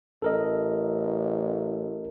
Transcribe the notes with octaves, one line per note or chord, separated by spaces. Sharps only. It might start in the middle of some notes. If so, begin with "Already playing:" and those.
A1 A4 A#4 D#5